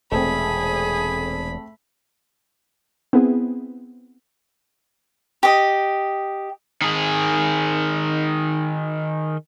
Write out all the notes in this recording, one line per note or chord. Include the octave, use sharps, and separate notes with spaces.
E1 A#2 A3 C4 G#4 B5
B3 C4 E4 G#4
G4 D#5
D#3 G#4